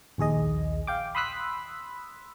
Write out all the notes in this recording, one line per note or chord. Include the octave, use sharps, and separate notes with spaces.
A#1 D#2 G#4 D#5
F5 G5 D6
B5 C6 D#6 E6 F#6 B6